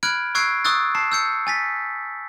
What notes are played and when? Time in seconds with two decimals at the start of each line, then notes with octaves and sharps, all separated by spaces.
0.03 B5 F6 F#6 G#6 D7
0.35 C#6 E6 F#6 G#6 C7 D7
0.65 C#6 D#6 E6 F#6 A6
0.95 A5 C7
1.12 E6 G6 C#7
1.47 G#5 A6 B6